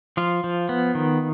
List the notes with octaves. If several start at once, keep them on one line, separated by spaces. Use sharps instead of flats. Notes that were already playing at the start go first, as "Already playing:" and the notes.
F3 F4
F3
B3
D#3